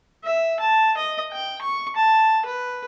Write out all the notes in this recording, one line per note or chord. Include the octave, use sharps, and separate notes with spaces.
E5
A5
D#5
G5
C#6
A5
B4